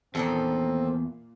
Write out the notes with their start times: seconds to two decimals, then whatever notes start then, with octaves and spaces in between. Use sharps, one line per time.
0.15 E2 A#2 D#3 F3 C4 A4